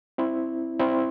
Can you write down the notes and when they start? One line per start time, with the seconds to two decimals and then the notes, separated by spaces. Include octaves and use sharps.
0.18 C4 E4
0.80 C4 E4